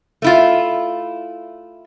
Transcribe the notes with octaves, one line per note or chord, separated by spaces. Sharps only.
A3 E4 F4